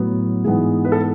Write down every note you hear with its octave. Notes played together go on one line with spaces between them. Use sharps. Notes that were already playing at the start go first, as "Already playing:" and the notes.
Already playing: A2 F#3 B3
G#2 E3 B3 G#4
B4
A4